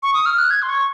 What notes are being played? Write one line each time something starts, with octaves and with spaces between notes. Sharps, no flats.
C#6
D#6
F6
F#6
G#6
C6
C#6